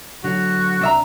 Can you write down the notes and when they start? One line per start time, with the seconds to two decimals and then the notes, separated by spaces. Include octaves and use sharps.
0.24 D3 F#3 F#4
0.81 C2 D4 E5 A#5